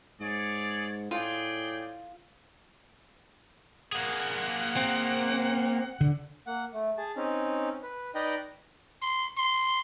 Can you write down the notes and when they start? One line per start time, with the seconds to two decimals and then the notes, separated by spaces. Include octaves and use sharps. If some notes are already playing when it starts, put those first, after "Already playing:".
0.20 G#2 G#4 C#5 D5
1.11 A2 F4 G#4 D5 G5
3.93 A#3 G#4 F#5
4.76 C4
6.01 D3
6.47 A#3 F#5
6.74 A3
6.98 G#4 A5
7.16 C4 C#4 D#4
7.83 B4
8.15 D#4 B4 D5 D#5 G5 A#5
9.02 C6
9.37 C6